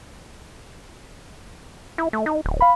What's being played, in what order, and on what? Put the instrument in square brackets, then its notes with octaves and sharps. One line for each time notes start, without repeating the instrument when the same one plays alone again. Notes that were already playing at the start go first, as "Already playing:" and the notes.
[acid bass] E4
A3
D#4
D1
[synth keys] F5 B5